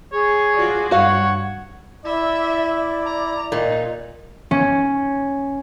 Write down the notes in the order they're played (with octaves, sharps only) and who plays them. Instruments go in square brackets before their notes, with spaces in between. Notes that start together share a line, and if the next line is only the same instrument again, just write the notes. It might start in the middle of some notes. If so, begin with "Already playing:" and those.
[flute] G#4 [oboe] C#5
[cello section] F4 F#4 D5
[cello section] G2 [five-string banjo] F#4 F5 [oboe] C#5 [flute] F#5
[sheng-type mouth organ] E4 [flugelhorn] D5 [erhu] E5
[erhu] A#5
[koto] A#2 [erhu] D#4
[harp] C#4